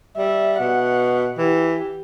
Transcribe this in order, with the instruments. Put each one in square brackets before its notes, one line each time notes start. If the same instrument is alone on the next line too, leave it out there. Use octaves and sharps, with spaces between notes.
[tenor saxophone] G3 [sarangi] E5
[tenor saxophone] B2 [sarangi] F#5
[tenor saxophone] E3 [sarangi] G4